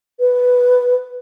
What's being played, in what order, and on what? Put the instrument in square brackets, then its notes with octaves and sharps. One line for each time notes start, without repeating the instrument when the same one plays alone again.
[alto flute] B4